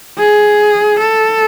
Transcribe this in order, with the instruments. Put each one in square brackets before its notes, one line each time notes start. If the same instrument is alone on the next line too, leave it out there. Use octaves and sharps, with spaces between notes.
[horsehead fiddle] G#4
A4